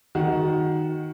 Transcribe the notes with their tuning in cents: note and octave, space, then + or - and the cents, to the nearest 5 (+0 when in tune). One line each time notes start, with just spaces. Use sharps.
D#3 +0 F#4 +0